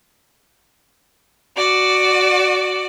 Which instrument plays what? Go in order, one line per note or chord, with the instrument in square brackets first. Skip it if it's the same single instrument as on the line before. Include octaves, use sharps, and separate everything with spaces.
[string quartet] F#4 D5